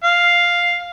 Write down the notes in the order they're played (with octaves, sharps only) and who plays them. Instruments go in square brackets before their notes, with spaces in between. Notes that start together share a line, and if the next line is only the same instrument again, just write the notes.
[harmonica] F5